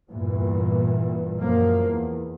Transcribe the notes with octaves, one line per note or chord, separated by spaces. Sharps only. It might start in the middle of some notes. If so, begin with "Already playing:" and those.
E2 G2 A#2 E3
F#2 F3 A#3
E2